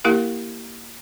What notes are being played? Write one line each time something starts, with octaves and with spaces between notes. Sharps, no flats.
A#3 E4 G4 A#4 F5